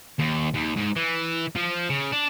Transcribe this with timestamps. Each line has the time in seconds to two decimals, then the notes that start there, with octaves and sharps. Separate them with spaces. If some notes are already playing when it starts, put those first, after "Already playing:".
0.19 D#2
0.55 D#2
0.77 G#2
0.96 E3
1.56 F3
1.90 C#3
2.12 D4